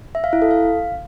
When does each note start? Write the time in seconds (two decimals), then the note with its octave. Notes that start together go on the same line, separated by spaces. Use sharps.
0.15 E5
0.24 F5
0.33 E4
0.42 A4
0.51 F5